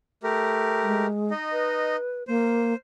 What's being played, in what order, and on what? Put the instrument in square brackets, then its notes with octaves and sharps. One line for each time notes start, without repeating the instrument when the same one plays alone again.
[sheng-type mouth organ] A3 G4 A#4
[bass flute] G#3
[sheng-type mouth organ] D#4 D#5
[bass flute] B4
[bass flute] A#3 [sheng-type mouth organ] C5